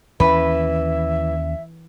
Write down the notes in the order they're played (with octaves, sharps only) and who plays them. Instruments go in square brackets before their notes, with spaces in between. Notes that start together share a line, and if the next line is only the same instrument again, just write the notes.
[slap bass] D#2 C#4 [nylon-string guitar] E3 [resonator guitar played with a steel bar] B4 [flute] E5